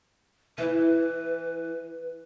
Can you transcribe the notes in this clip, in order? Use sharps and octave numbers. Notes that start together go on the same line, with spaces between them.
E3 E4 B4